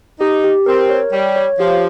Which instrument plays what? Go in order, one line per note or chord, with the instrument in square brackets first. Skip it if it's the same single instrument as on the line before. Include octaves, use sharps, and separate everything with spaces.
[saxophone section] D#4 [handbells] G4
[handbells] G4
[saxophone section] C4 [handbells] A#4
[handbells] C#5
[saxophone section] G3 [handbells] C#5
[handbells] C#5
[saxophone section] F3 [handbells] G4